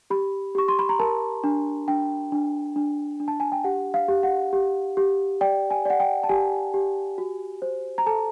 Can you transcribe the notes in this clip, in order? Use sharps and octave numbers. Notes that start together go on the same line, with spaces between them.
G4 B5
G4 C#6
C6
B5
A#5
A#4 A5
D4
D4 G5
D4
D4
D4
A5
G#5
G5
G4 F#5
F5
G4
F#5
G4
G4
D5 G5
G#5
D5 F#5
G5
A5
G4 G#5
G4
F#4
C5
A#5
A4 A5